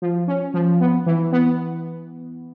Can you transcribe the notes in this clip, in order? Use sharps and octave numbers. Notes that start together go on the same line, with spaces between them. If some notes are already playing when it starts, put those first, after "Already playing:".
F3
C#4
F3
B3
E3
B3